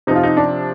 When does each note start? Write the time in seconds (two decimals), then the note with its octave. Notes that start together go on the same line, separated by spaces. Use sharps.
0.07 C3 F3 D#4
0.16 F4
0.23 D#4
0.37 D4